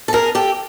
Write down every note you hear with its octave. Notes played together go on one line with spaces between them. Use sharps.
A4
G#4 A#4
G4 A4